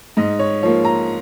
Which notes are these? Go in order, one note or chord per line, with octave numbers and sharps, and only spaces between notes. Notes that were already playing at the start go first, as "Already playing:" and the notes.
G#2 D#5
C#5
F3 A#3 C#5
A#5